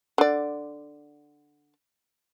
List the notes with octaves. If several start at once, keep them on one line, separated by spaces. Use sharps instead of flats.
D3 D5